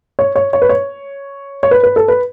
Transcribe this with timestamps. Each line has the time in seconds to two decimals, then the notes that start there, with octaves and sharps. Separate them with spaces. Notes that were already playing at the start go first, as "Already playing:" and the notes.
0.19 C#5
0.36 C#5
0.53 C#5
0.62 B4
0.69 C#5
1.63 C#5
1.71 B4
1.83 B4
1.96 A4
2.08 B4